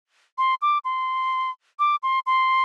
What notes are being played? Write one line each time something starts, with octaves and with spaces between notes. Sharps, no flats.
C6
D6
C6
D6
C6
C6